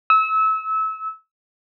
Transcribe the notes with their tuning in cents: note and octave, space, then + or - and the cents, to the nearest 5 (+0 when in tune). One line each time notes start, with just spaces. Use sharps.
E6 -25